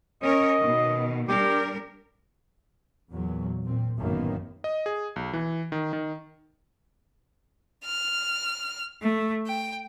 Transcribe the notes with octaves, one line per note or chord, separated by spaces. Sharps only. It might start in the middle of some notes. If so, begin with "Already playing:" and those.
C#4 A#4 C#5 D#5
B2 D#3
G3 D4 G4 A#4
E2 A#2 F#3
A#2 C4
A1 F#2 A2 D#3 A#3 B3
D#5
G#4
B1
E3
D#3
D#3
F6
A3
G5